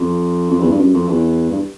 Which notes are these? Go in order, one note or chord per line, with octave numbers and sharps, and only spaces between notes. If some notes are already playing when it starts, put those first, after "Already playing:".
Already playing: F2
F2
E2
G2
F#2
F2
E2
G2